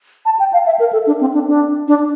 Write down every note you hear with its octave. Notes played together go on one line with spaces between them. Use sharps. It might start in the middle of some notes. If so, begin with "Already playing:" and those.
A5
G5
F5
E5
A#4
A4
D4
C4
D4
D4
D4